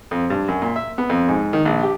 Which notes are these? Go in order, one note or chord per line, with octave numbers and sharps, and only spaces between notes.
F2
G2
F#2
A#2
E5
B3
F2
G#2
D#3
A#1
G4